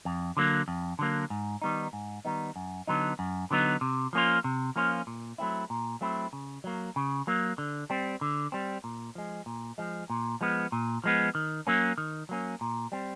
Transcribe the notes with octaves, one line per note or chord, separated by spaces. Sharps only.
F2
D3 F#3 A#3
F2
D3 F#3 A#3
G#2
D#3 G3 B3 D#4
G#2
D#3 G3 B3 D#4
F#2
D3 F#3 B3 D#4
F#2
D3 F#3 B3 D#4
C3
F3 A#3 C#4 F4
C3
F3 A#3 C#4 F4
A#2
F#3 A3 C4 E4
A#2
F#3 A3 C4 E4
C#3
F#3 A#3
C#3
F#3 A#3
D3
G3 C4
D3
G3 C4
A#2
F3 G#3
A#2
F3 G#3
A#2
F3 G#3 B3
A#2
F3 G#3 B3
D#3
F#3 A#3 C#4
D#3
F#3 A#3 C#4
A#2
G3 C4